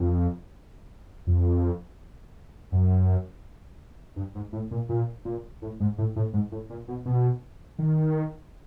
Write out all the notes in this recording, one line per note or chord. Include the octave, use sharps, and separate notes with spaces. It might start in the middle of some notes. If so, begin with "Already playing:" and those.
Already playing: F2
F2
F#2
G2
G#2
A2
A#2
A#2
A#2
A2
G#2
A2
A2
G#2
A2
A#2
B2
B2
D#3